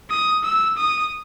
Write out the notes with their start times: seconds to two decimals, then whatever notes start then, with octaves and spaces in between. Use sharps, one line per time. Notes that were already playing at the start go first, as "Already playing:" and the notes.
0.10 D#6
0.44 E6
0.77 D#6